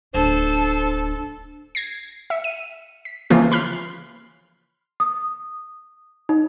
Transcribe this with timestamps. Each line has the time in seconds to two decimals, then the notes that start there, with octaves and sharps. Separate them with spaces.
0.14 D1 D4 A4 C5
1.75 G#6 A#6 C7
2.30 E5 C#7
2.44 D#7
3.05 B6
3.30 C#3 E3 F3 A#3 F4
3.52 B5 C6 F6 C7
5.00 D#6
6.29 D#4